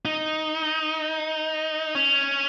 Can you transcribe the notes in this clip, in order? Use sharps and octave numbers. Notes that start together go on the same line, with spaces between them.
D#4
C#4